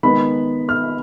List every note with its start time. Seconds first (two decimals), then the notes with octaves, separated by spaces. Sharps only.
0.03 D#3 G#3 B3 B5
0.69 F6